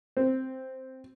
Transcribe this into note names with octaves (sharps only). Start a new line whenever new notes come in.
C4